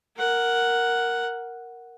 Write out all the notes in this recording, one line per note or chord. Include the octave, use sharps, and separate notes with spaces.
A#4 F#5